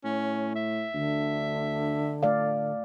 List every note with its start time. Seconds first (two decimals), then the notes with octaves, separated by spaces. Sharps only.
0.04 A2 C#4
0.56 E5
0.94 D2 D3
2.23 A3 D5 F5